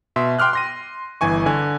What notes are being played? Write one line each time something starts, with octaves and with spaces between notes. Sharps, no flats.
B2 E5 C6
G5 C6 D6 F6 F#6
C6 A#6 D#7
G1 E3 G#5 C#6
D3 G#5 F#6